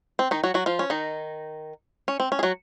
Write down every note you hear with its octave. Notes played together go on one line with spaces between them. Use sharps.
C4
D#3 D#4
F#3 F#4
F#3 F#4
F3 F4
C#4
D#3 D#4
C#4
C4
C#4
G#4
F#3 F#4